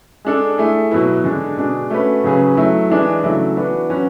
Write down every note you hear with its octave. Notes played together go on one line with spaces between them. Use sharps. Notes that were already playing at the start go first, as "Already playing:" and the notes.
G#3 D4 A4
A3 E4 G#4
B2 F#3 B3 E4
D3 G#3 D4
B2 G#3 D4 G#4
A3 C#4 F#4 B4
C#3 F#3 C#4 G#4 B4
F#3 A3 E4
E3 G#3 D4
C#3 F#3 A3 E4
E3 B3 D4 F#4
F#3 C#4 F#4 B4